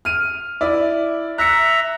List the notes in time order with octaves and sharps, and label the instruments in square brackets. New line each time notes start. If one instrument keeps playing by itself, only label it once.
[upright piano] F6 D#7
E4 D5
[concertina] E5 A#5 [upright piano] F#6 C#7